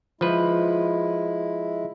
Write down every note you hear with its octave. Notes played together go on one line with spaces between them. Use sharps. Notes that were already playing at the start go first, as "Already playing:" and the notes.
F3 G#3 E4 B4